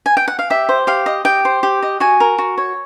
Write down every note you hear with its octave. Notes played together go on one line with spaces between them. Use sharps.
G#5
G5
F#5
F5
G4 E5
C5
G4 F5
D#5
G4 G5
C5
G4
D#5
F#4 G#5
A#4
F#4
C#5